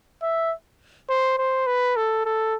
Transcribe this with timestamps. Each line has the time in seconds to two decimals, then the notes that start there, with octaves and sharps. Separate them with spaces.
0.22 E5
1.09 C5
1.38 C5
1.67 B4
1.96 A4
2.25 A4